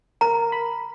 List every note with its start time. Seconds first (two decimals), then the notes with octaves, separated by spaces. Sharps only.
0.21 A#4 A#5
0.52 B5